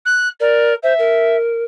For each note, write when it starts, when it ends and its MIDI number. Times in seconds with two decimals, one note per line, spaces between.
0.06 0.28 90
0.40 0.75 70
0.40 0.73 74
0.83 0.94 72
0.83 1.37 76
0.99 1.64 70